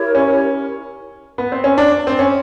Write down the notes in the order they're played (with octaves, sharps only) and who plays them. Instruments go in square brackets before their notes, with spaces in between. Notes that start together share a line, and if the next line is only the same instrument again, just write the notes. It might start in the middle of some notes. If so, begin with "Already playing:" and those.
Already playing: [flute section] E4 G4 A#4 C#5
[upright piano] C#4
B3
C4
C#4
D4
C4
C#4